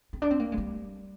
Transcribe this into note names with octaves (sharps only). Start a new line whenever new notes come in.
C4
D4
C4
A#3
G#3
G3